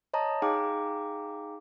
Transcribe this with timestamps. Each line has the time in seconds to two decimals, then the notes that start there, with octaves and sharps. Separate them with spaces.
0.14 C#5 D#5 A5 A#5 D#6
0.42 D#4 G#4 F5 G5 A#5 D6